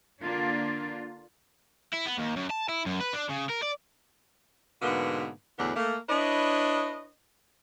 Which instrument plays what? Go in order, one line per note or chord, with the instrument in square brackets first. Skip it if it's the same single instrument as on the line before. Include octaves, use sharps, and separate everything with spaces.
[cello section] D3 A#3 D4 F4
[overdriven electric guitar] E4
B3
D#2
F#2
A5
E4
F#2
B4
D4
C#3
A#4
D5
[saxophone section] G#2 B2 D3 A#3 B3
E2 A2 D3 F#3 B3 D4
A3 A#3
D4 E4 B4 C#5 D#5